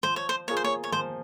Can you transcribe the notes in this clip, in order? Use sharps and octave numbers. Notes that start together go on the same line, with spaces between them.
F3 C5
C#5
C5
A#3 F4 G#4 C#5
C5
C#5
C#5
F3 C5